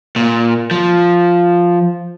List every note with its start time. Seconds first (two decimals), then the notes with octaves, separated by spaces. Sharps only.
0.16 A#2
0.71 F3